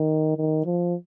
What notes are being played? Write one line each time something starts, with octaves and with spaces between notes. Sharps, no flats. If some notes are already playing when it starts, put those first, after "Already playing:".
Already playing: D#3
D#3
F3